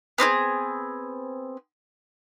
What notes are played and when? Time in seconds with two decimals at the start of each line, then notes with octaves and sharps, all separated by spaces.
0.18 B3 C4 D4 G#4